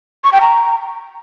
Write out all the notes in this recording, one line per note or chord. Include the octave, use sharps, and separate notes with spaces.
C#6
G5
A#5